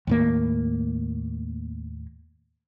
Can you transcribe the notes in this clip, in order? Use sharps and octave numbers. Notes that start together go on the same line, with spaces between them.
D#2 A2 A#3